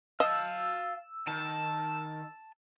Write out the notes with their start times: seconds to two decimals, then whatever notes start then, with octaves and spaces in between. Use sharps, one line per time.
0.20 D#5 F5 A5 E6
1.27 D#3 A5